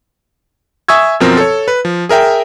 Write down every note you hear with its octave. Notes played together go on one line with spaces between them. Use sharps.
E5 G#5 C#6 D#6 E6 G#6
F#2 B2 F3 C4 A#4
A4 C#5
B4
F3
G#4 A#4 E5 G5